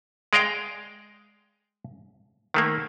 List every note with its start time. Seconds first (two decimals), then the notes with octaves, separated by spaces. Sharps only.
0.33 G#3 D5 D#5 F5 G5
2.54 D#3 A3 A#3